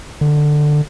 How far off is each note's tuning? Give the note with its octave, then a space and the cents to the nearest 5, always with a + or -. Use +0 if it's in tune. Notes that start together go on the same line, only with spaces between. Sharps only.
D3 +15